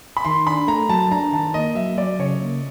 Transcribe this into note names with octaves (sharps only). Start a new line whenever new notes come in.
B5
D#3 C6
D4 B5
A3 A#5
F#3 A5
D4 A#5
D#3 A5
A#3 D#5
F#3 E5
F#3 D5
C#3 C#5
A#3